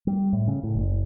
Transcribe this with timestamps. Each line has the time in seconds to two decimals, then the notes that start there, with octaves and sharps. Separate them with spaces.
0.07 G3
0.33 A2
0.48 C#3
0.63 A2
0.75 F#1